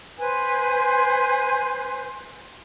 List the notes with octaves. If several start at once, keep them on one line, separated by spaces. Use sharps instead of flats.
B4 C5 G#5